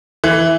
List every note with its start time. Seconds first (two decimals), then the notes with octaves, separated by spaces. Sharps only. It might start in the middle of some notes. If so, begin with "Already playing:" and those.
0.24 E3